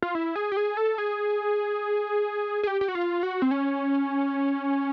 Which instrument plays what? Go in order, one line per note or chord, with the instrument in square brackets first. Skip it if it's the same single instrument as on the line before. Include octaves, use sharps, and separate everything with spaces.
[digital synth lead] F4
E4
G#4
G4
G#4
A4
G#4
G#4
G4
G4
F#4
F4
F#4
C4
C#4